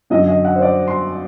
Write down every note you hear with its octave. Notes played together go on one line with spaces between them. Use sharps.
F#2 D3 F#3 D#5
D#5
F#5
C5
D5
C6